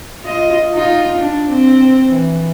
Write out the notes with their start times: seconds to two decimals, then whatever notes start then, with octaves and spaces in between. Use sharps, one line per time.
0.23 F4 D#5
0.74 D#4 F4
1.17 D4
1.51 C4
2.12 E3